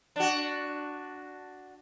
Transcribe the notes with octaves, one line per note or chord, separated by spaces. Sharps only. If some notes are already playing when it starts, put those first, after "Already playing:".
D4 F#4